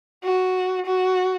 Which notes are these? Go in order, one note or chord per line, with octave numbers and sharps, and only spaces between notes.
F#4
F#4